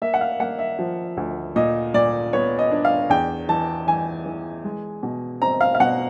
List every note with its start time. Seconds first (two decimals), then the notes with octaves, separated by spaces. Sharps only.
0.02 A#3 E5
0.14 F#5
0.21 F5
0.40 A#3 F#5
0.59 E5
0.79 F3
1.17 D2
1.56 A#2 D#5
1.94 A#2 D5
2.33 B3 C#5
2.59 D#5
2.71 D4
2.85 F5
3.10 E2 G5
3.49 E3 A5
3.87 E3 G#5
4.26 E3
4.64 G#3
5.03 B2
5.42 C4 A#5
5.61 F5
5.75 F5
5.80 B2 F#5